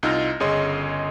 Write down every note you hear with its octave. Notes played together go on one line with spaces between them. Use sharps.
C2 D#4 F4 E6 F6 A#6
G1 C#3 G#4 C#5 D#5 C6